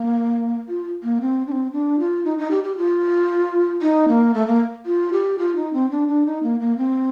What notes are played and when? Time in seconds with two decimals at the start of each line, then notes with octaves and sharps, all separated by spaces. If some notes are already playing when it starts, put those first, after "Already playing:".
Already playing: A#3
0.69 F4
1.03 A#3
1.21 C4
1.47 D4
1.52 C4
1.72 D4
1.99 F4
2.25 D#4
2.38 D#4
2.51 G4
2.64 G4
2.78 F4
3.82 D#4
4.08 A#3
4.34 A3
4.47 A#3
4.86 F4
5.13 G4
5.39 F4
5.56 D#4
5.73 C4
5.91 D4
6.08 D4
6.26 D#4
6.43 A#3
6.60 A#3
6.78 C4